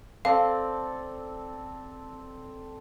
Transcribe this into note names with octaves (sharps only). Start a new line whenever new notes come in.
C4 A4 D5 F5